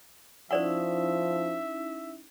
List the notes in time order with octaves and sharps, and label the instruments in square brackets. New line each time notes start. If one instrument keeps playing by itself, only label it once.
[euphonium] F3 [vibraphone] C#4 D#4 E4 [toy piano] C5 D5 F#5 [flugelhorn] E5